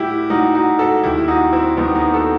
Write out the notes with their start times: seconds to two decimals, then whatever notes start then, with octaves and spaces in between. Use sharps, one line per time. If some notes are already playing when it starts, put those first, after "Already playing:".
Already playing: A2 G3 E4 F#4 G4
0.30 A2 G3 D#4 F#4
0.55 D#4 F#4
0.79 F#4 A4
1.03 D#2 D#3 G3 E4 G4
1.18 E4
1.28 D#4 F#4
1.52 C4 E4
1.77 D#2 D#3 G3 B3 D#4
1.95 B3 D#4
2.14 F#4 A4